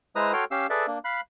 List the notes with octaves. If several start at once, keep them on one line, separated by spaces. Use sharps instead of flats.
G#3 E4 B4 C5 A#5 D#6
F#4 A4 C#5 G5 C6 F6
C#4 G4 F5 E6
G#4 A4 B4 D5 E5
A#3 D4
F5 B5 F#6